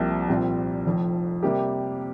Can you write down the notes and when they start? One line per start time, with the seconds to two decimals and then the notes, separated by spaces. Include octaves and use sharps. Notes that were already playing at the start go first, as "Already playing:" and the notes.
Already playing: C2 C3 F3 A#3 G4
0.28 A#1 A#2 G3 C4
0.86 F1 F2 F3
1.43 C3 G3 A#3 G4